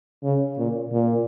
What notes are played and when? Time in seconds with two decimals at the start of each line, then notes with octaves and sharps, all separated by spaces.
0.23 C#3
0.58 A#2
0.92 A#2